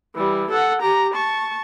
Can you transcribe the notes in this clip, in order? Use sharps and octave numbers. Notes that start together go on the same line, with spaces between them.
E3 G3
A4 F#5
G4 A#5
A5 C#6